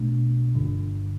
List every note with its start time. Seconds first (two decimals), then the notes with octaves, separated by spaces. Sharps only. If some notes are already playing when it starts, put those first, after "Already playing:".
Already playing: B1 B2 A3 D4
0.55 G1 G2 D3